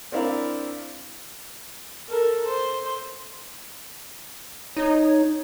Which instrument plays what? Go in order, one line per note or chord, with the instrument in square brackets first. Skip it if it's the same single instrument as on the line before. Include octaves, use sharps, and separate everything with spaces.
[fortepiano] C4 D4 E4 A#4 F5
[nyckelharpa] A4 A#4
C5
[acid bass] D#4 [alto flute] C#5